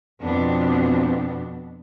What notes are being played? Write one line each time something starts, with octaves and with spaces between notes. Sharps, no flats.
F2 B2 B3 C4 D4